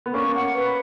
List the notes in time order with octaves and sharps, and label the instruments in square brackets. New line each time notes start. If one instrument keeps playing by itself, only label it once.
[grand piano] B3
[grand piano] A#3 C#4 [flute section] C#6
[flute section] F#5
B4